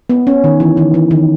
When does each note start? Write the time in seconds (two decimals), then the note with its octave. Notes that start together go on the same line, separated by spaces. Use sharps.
0.10 B3
0.27 C#4
0.44 D#3
0.60 E3
0.77 D#3
0.94 E3
1.11 D#3